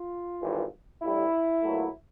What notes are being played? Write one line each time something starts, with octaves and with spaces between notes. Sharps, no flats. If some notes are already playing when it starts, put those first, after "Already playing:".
Already playing: F4
G#1 G2 E3
A1 G2 E3 G3 E4
B1 A#2 F#3 A3